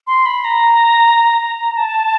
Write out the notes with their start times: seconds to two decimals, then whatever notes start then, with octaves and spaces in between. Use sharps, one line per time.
0.07 C6
0.26 B5
0.44 A#5
1.77 A5